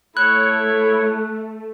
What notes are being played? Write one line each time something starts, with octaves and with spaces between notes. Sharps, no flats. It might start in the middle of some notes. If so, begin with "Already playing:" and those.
A3 E4 C#5 F#6